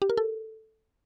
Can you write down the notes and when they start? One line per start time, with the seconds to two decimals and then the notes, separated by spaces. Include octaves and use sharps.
0.02 G4
0.10 A#4
0.17 A4